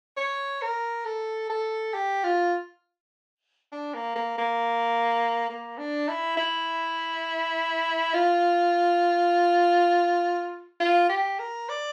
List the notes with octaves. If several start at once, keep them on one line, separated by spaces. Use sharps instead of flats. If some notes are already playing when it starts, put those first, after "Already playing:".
C#5
A#4
A4
A4
G4
F4
D4
A#3
A#3
A#3
A#3
D4
E4
E4
F4
F4
G4
A#4
D5